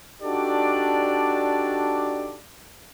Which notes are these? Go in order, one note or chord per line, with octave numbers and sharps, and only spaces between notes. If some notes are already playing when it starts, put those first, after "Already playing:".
D4 D#4 F#4 G4 A4 D5